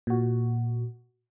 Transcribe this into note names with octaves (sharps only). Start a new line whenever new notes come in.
A#2 F#4